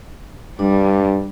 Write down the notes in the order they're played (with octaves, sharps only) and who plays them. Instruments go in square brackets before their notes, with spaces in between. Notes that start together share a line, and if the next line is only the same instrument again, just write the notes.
[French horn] G2 [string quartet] G3 [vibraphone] D4